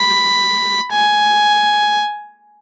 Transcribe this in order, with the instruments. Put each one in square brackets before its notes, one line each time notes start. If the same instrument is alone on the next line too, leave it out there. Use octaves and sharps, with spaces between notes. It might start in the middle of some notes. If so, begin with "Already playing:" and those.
Already playing: [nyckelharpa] B5
G#5